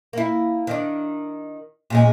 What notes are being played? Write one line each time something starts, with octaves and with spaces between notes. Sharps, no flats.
A#3 E4
D#3 D4
A#2 C#3 G#3